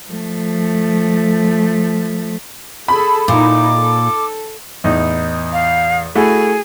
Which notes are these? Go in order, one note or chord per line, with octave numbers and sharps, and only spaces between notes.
F3 A3
G#4 A4 B5
A#2 D#4 E4 D6
A4
E2 A2 D#4
F5
A3 E4 F#4 G#4